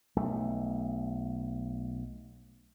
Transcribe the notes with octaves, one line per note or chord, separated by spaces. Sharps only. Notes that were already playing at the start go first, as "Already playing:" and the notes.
B1 A3